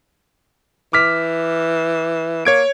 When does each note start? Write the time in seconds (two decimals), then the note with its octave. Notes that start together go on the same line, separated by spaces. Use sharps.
0.93 E3 D6 F6 B6
2.45 A#3 C#5 G#6 D7